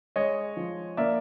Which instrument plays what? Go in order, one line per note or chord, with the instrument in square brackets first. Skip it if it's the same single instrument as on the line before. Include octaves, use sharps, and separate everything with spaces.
[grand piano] G#3 C#5 D#5
F3
A#3 D5 E5